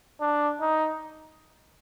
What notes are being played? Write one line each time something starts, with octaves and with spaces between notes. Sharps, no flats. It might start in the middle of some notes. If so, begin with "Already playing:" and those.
D4
D#4